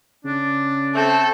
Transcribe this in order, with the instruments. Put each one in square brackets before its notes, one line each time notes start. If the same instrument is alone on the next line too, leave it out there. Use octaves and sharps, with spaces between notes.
[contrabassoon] C#3 [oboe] D4
[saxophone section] A3 C4 [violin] A4